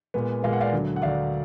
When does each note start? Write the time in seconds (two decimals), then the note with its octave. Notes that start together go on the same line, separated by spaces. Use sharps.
0.14 A#2 G#3 B3
0.43 A#2 G#3 B3 F5
0.53 F#5
0.61 D5 F5
0.72 D2 D3 F#3
0.96 F#5
1.02 D2 D3 F#3 D5 F5